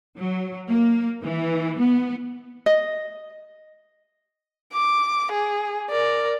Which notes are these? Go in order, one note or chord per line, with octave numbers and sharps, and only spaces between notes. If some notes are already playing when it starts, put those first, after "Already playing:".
F#3
A#3
E3
B3
D#5
D6
G#4
A#4 D5